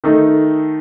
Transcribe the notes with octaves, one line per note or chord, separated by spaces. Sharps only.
D#3 A3 D#4 A4